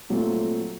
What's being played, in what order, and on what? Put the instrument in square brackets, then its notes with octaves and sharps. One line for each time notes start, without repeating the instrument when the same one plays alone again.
[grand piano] A#2 F#3 A3 C4 F4